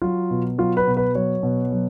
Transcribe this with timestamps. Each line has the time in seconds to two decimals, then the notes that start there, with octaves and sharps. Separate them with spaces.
0.02 F#3 F4
0.31 B2
0.58 F#3 F4
0.77 B4
0.87 B2
0.97 B4
1.15 F#3 C#5
1.43 B2
1.72 F#3